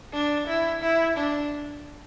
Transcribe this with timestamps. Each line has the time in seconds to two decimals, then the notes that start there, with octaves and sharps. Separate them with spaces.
0.13 D4
0.48 E4
0.83 E4
1.17 D4